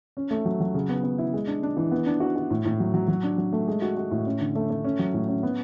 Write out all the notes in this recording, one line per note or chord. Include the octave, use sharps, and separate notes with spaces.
C#4
A3
F#3
F#3
C#3
B3
B3
E4
G#3
D4
D4
E3
B3
D4
F#4
F#4
A2
A2
F#3
F#3
F#3
D4
F#3
A3
G#3
F#4
F#4
A2
C#4
D3
A3
A3
C#4
F#3
A2
C#4
B3